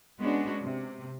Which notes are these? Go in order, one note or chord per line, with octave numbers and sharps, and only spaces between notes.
G#3 B3 C#4 D4 F#4
C3